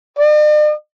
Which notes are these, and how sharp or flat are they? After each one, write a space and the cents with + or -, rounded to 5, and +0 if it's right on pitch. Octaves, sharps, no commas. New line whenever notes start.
D5 +45